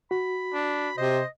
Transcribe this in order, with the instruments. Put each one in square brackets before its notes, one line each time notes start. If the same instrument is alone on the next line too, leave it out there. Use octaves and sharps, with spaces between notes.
[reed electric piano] F#4 [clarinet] B5
[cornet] D4
[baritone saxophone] C3 [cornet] C5 [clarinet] D#5